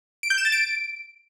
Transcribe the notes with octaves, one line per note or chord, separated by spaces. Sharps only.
D7
G6
E7
A6
D7